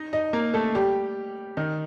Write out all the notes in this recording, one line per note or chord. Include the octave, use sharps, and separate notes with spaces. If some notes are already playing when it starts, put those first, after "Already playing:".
Already playing: D#4 D#5
D#4 D#5
A#3 A#4
A3 A4
G3 G4
D#3 D#4